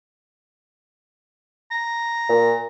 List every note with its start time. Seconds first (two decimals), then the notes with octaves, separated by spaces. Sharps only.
1.71 A#5
2.29 A#2